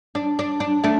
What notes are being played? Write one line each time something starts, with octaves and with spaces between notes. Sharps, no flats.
D4
D4
D4
A3 D4